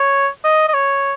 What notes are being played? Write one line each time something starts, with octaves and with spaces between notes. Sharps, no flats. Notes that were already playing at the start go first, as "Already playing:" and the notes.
Already playing: C#5
D#5
D#5
C#5